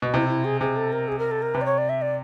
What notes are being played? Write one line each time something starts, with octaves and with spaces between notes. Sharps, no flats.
B2
C3 E4
E4
G#4
C3 G#4
A4
A#4
G#4
A#4
A4
A#4
C3 B4
D5
C#5
D5
E5
D5